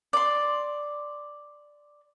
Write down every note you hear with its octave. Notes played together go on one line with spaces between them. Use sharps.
D5 C6